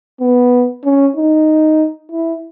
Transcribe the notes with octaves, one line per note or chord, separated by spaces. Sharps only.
B3
C#4
D#4
E4